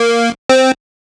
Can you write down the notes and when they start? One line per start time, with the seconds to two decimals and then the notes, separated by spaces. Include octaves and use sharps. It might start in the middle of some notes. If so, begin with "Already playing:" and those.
Already playing: A#3
0.49 C4